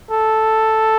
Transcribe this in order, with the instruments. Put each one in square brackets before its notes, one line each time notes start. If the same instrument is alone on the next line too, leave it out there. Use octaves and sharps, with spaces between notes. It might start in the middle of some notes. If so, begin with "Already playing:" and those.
[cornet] A4